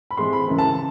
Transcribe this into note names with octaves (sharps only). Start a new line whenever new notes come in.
B5
A2 E3 G#3 C4 C6
B5
F#2 C#3 E3
A5